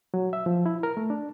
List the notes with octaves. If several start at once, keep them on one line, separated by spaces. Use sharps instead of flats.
F#3
E5
F3
E4
A#4
A3
D4